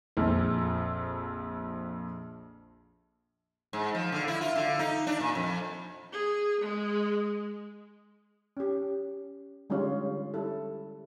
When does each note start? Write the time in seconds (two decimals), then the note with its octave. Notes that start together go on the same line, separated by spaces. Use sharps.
0.17 A#1 F2
3.73 G#2
3.95 F3
4.12 D3
4.28 E4
4.41 F4
4.56 D3
4.79 D#4
5.07 D4
5.20 A#2
5.35 F2
6.12 G#4
6.61 G#3
8.57 C#4 G4
9.70 D3 G3 G#3 C#4 F4 C#5
10.34 G3 E4 A4